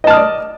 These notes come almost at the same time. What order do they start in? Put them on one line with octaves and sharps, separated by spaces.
D#5 A5 F6 D#6 D5